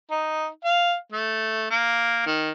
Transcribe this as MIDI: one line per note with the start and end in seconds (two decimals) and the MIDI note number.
0.11 0.48 63
0.64 0.95 77
1.12 1.70 57
1.71 2.24 58
2.26 2.51 51